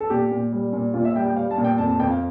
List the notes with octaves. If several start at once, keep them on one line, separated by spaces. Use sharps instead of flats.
A4
A#2 G4
A#2
G3
A#2
A#2 F4
E5
G3 G5
G5
G3 F5
A5
A#2
G5
F2 A5
A5
F2 G5
F5